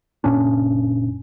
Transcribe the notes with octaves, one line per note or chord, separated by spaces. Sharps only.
F#1 A#2 C#4 D4